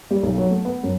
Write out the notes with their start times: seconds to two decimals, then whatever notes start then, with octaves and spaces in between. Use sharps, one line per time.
0.11 G3
0.23 B1
0.38 F#3
0.50 A3
0.65 B3
0.83 F#2